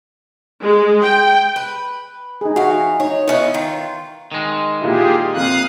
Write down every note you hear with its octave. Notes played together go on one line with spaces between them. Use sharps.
G#3
G5
B4
D#4 G#4
E3 F#4 F5
D#4 C#5
B3 C#4 D#4 E4 C#5
D#3 F4
D#3 G#3
A#2 E4 F4 G4 G#4
F2 A#2 F5 D#6 F#6